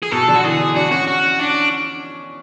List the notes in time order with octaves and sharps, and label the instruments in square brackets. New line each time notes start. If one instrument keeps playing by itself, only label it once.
[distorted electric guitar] G#4
[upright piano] B2 [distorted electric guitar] A4
[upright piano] D3
[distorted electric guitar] F#4
[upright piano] E3 [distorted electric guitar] G#4
[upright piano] D4
[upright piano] D4 [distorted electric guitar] F#4
[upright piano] C#4 [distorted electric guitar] F#4
[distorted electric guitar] F#4
D4